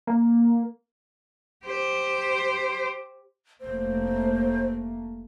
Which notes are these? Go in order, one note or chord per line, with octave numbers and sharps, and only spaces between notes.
A#3
G4 C5
F1 A3 A#3 C5